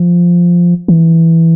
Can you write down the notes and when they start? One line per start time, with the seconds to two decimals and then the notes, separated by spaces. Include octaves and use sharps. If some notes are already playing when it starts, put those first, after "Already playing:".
Already playing: F3
0.88 E3